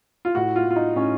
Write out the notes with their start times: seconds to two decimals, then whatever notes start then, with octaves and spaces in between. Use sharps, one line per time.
0.25 F4
0.35 A2 F#4
0.56 F4
0.66 A2 F4
0.76 D#4
0.95 A2 C#4